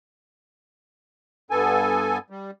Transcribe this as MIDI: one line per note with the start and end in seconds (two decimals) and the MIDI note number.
1.51 2.18 43
1.51 2.18 59
1.51 2.18 69
1.51 2.18 80
2.30 2.51 55